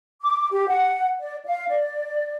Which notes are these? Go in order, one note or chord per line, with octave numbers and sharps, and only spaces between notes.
D6
G4
F#5
D5
F5
D5